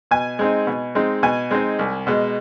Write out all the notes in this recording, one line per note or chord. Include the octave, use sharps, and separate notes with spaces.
B2 G#5
G#3 C4 D#4
B2
G#3 C4 D#4
B2 G#5
G#3 C4 D#4
C2
B2 G#3